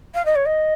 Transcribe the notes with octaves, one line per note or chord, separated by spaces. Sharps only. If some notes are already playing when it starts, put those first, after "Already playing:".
F5
D#5
C#5
D#5